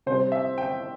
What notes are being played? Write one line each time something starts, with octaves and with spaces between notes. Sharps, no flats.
C3 C5
G3
E5
G5